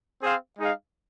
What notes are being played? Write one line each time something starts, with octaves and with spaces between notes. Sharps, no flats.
C4 G#4 C5 F5
G#3 D#4 G#4 F5